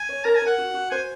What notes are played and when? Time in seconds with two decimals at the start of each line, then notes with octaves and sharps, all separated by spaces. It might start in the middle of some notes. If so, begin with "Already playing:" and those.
Already playing: G#5
0.09 C#5
0.25 A#4 A#5
0.36 G#5
0.42 A#4 F#5
0.58 F#4
0.74 F#4
0.91 C5 G#5